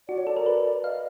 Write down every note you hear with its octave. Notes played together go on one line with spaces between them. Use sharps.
F#4 D5
C#5
A4 D5
A#4
B4
D5
D#5 F5